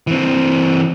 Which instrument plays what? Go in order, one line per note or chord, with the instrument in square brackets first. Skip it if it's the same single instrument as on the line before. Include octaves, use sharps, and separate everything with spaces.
[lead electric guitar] E3 C4